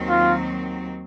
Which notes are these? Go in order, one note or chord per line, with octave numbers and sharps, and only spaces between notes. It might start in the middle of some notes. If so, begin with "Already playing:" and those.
Already playing: D#2 D#3 F#3 C4
F4